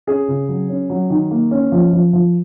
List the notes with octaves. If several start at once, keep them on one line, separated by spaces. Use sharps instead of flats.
C#4 G#4
C#3
F#3
C#4
F#3
D#3
A#3
C#4
F3
F3
F3